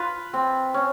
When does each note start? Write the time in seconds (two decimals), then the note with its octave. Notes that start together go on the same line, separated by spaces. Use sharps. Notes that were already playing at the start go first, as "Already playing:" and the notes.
Already playing: F4 B4
0.33 C4
0.74 C#4